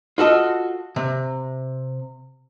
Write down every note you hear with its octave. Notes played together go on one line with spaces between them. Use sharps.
F4 F#4 A4 D#5
C3